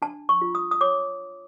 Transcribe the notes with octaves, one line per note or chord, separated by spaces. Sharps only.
D4 A5
C#6
F4
D#6
D#6
C#5 D6